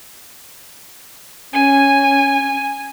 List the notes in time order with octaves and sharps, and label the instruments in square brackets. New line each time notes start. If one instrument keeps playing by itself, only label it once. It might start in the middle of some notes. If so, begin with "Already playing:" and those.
[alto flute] C#4 [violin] G#5